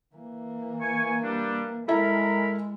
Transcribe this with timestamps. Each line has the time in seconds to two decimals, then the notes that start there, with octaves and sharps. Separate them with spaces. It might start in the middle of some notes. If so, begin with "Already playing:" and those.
0.15 E3 A#3
0.81 G#5 C#6
1.23 G3 D4
1.88 G#3 E4 A4 A#4 B5